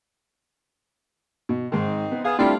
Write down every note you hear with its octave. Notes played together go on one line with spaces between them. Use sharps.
B2
G#2 D#3 C4 D#4
B3
B3 G#4 F5
G3 A3 C4 D4 E4 F4 D5